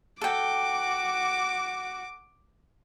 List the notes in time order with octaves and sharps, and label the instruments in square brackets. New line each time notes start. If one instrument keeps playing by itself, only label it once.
[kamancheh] F#4 [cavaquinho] A4 G5 [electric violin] D6